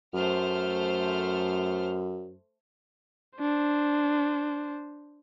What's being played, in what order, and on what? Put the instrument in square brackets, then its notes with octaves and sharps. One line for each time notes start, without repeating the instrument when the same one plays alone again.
[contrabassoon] F#2 [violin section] A3 C5 F6
[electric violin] D4 C5